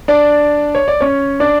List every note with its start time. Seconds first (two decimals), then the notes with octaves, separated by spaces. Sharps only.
0.08 D4 D5
0.75 C#5
0.88 D5
1.01 C#4 C#5
1.40 D4 D5